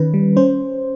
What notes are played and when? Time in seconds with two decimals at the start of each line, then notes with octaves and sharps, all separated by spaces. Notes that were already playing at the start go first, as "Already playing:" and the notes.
Already playing: D#3 C#4 B4
0.14 G3
0.36 C#4 C5